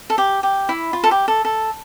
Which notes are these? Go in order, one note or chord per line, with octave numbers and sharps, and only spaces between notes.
A4
G4
G4
E4
F4
A4
G4
A4
A4